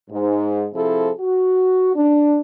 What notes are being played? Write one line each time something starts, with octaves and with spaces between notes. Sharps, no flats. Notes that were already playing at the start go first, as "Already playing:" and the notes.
G#2
C3 F3 C4 E4 G#4 A4
F#4
D4